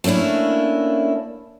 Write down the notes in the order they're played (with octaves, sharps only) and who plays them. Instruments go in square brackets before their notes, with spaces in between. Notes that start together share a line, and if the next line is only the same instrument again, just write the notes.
[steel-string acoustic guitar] A3 A#3 C#4 D4 E4